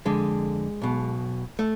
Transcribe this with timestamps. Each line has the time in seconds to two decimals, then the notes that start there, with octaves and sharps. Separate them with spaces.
0.05 F2 D3 G#3
0.82 B1 B2
1.59 A3